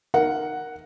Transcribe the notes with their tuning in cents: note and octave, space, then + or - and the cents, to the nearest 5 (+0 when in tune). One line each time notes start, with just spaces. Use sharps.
A#4 +0 F#5 +0